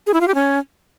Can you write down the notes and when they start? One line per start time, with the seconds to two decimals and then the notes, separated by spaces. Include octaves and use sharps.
0.07 G#4
0.14 E4
0.21 F4
0.28 G4
0.35 C#4